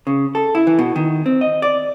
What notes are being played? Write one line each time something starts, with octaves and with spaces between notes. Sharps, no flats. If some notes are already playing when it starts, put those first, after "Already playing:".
C#3
A4
E4
E3
B2
D#3
C4
D#5
D5